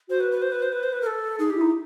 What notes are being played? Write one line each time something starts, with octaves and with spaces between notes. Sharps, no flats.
F#4 C5
B4
B4
C5
B4
C5
B4
C5
B4
A#4
A4
D#4 G#4
G4
E4
D#4